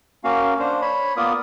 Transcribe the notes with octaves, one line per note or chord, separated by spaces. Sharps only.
A#3 C#4 F#4 F5
D4 C5
C#5 B5
A#3 B3 F4 A#4 D5 D#6